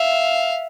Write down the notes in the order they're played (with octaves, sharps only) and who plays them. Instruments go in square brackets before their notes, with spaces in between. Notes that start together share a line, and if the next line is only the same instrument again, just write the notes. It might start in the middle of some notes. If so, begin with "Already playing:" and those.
Already playing: [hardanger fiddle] E5 [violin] F5